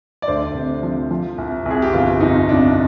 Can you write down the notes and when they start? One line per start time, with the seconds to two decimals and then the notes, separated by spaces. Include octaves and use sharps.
0.22 D5
0.28 D2 C5
0.54 C3
0.83 F3
1.11 F3
1.38 C2
1.66 C2
1.71 G#4
1.82 G4
1.93 G1 F4
2.20 F2 D#4
2.49 C3 D4